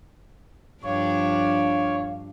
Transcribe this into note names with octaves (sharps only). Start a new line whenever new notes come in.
G2 F3 D4 C#5 F5